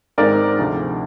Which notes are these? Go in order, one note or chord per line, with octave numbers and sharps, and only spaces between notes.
G#2 D#3 G#3 C4 A#4 D5
D2 C3 F3